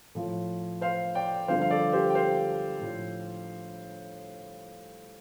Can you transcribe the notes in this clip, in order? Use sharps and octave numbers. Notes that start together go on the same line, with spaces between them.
A2 F3
C5 F5
D5 G5
G2 D3 F3 C5 F5
F5
A4 D5
G4 C5
G5
C5 F5
A2 F3